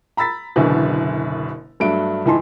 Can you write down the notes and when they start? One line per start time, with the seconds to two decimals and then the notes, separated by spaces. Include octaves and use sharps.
0.17 A#5 B5 E6 A6 B6
0.56 F#1 F#2 B2 D3 E3
1.80 G2 F#3 A3 D4 D7
2.25 C#2 A2 E3 D#4 A5 C6